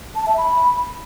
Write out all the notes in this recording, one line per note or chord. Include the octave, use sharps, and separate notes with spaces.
A5
E5
B5